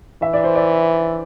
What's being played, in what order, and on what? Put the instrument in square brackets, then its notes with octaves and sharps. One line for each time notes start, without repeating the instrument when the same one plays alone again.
[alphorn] E3 [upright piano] E5
[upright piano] D5
C5
D5